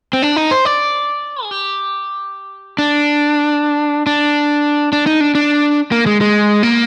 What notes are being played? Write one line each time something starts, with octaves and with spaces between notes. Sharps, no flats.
C4
D4
D#4
C5
D5
G#4
G4
D4
D4
D4
D#4
D4
D4
A#3
G#3
G#3
A#3